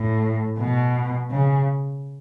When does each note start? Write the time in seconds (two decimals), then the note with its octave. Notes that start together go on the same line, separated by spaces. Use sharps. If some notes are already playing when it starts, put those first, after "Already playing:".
Already playing: A2
0.58 B2
1.31 C#3